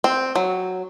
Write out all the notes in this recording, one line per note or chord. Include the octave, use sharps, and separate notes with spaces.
C4
F#3